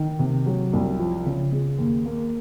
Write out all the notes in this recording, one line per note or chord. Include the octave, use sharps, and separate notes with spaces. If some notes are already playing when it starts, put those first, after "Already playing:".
Already playing: D#3
C3
F#3
C2
F3
C#3
G#3
D#2
A#3